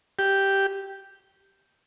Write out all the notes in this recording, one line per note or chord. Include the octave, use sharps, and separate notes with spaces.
G4